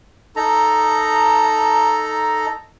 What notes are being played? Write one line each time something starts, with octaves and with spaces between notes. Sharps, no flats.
D#4 A4 A#5